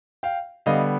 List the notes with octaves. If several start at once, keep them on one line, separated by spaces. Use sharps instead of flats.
F5 G5
D3 G3 B3 D#5 F5